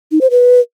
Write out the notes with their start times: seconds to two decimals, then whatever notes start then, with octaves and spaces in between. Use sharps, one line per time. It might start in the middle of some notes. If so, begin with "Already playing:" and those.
0.12 D#4
0.21 C5
0.31 B4